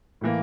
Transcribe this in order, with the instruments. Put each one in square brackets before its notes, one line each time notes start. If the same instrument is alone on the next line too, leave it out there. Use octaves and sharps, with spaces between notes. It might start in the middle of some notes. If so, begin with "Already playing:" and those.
[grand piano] A2 E3 A#3